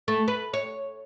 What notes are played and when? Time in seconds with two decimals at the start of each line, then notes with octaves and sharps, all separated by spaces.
0.08 A3
0.28 B4
0.54 C#5